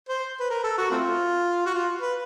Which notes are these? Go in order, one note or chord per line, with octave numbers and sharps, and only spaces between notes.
C5
B4
A#4
A4
F#4
A3 C4 F4
F#4
F4
B4